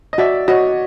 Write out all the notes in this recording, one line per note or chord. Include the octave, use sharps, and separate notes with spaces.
D#5
F#4 D5 E5
F#4 C#5 D#5